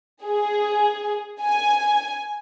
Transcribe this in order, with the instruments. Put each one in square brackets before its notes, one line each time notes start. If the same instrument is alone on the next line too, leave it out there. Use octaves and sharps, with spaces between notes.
[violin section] G#4
G#5